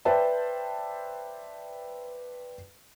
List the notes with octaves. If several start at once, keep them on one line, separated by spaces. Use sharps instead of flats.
B4 C5 D5 E5 G5 A5